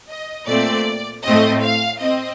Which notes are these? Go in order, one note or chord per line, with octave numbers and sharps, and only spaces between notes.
D#5
A#2 A3 C4 D5
A2 A3 C4 D#5
F5
C4 D#5